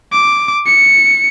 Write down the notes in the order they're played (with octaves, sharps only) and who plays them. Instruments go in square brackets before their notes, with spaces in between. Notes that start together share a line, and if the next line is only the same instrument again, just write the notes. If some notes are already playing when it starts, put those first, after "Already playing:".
[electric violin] D6
C#7